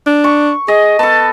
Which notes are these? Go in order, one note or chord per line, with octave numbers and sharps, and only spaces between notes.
D4
C#6
G#4 D#5
B3 A4 A5